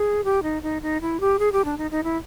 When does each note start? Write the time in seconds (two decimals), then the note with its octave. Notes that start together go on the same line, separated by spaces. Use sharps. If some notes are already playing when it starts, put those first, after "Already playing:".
Already playing: G#4
0.24 G4
0.43 D#4
0.62 D#4
0.82 D#4
1.01 E4
1.20 G4
1.39 G#4
1.52 G4
1.65 D4
1.78 D#4
1.91 D#4
2.04 E4